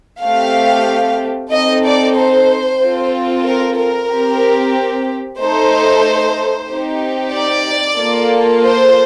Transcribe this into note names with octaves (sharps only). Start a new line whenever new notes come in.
A3 C4 G4 F5
C4 D#4 A4 D#5
D5
C5
C4 F4 A4
A#4
A#4
C4 G4
A3 D#4 A4 C5
C4 D#4 G4
D5
A#3 F4 A4
C5